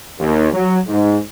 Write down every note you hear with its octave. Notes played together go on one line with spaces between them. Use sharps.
D#2
F#3
G#2